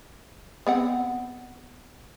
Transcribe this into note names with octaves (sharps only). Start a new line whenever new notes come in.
B3 C4 F#5